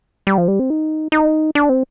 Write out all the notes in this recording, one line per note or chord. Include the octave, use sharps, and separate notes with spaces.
G3
F3
G3
C4
D#4
D#4
D4
C4